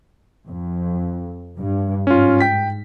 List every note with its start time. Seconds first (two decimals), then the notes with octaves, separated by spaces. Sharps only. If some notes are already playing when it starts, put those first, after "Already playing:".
0.46 F2
1.57 G2
2.07 G#2 C#4 F4
2.41 G5 B6